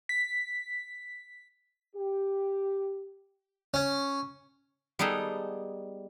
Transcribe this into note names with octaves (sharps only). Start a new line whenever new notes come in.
B6
G4
C#4
G3 B3 D#4 G#4 A4